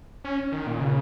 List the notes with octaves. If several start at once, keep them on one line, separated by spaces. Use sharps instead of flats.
C#4
D#3
A#2
C#3